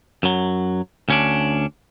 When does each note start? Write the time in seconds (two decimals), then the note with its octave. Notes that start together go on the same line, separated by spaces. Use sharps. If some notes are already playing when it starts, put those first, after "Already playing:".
0.23 F#2 F#3
1.09 D2 C#4 D4